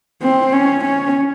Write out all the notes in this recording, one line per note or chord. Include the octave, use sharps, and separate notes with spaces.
C4
C#4
C#4